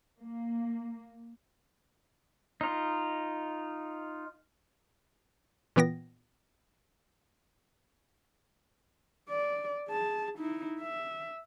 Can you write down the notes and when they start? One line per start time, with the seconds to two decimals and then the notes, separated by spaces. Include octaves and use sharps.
0.22 A#3
2.61 D#4 F4
5.76 A#2 E3 B3 G5 A#6
9.29 D5
9.89 G#4 A5
10.38 D#4 E4
10.80 E5